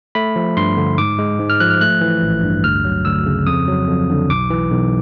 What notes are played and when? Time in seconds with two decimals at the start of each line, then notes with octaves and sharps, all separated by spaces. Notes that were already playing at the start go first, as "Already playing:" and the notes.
0.15 A3 B5
0.36 F3
0.57 G2 C6
0.77 D3
0.98 G#2 D6
1.19 G#3
1.39 G#2
1.50 F6
1.60 F3 F#6
1.70 F6
1.81 A3 F#6
2.01 E3
2.22 A1
2.44 G2
2.64 D2 F6
2.85 F#3
3.05 D2 E6
3.26 C#3
3.47 F2 D#6
3.68 F#3
3.88 F2
4.10 D3
4.30 B1 D6
4.50 E3
4.71 B1